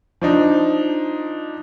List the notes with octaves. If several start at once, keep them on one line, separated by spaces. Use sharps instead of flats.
F3 D4 D#4